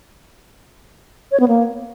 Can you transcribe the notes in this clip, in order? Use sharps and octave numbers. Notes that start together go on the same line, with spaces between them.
C#5
B3
A#3